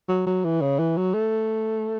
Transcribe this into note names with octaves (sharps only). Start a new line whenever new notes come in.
F#3
F#3
E3
C#3
E3
F#3
A3